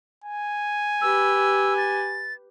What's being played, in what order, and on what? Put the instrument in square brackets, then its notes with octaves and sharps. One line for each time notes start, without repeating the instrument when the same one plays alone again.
[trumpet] G#5
[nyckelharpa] G4 B4 [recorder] E6
[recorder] A6